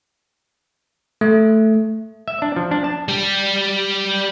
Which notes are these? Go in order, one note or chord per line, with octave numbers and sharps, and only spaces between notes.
A3
E5
D4
F3
D4
A5
G3 G4